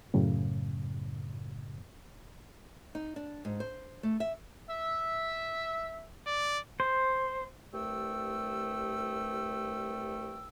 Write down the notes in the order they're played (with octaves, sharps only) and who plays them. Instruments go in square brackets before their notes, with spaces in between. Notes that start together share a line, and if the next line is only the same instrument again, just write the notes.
[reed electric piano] F#2 A2 C#3
[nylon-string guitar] D#4
D4
G#2
C5
A3
E5
[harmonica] E5 E6
[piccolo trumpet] D5
[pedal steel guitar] C5
[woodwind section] C2 G2 A3 G5 E6